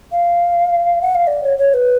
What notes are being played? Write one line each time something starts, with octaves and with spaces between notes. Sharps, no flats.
F5
F#5
F5
D5
C#5
C#5
B4